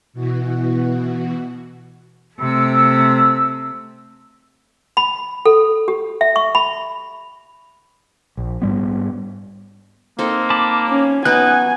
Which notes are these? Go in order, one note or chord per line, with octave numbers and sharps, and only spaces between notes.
B2 E3 F#4
C3 A3 E6
B5
A4
G4
E5
C#6
B5
A#1
G#2 G3 B3
A#3 C4 D#4 A4
A5 B5 D6
C#4
B3 D#4 F#4 G#5 F#6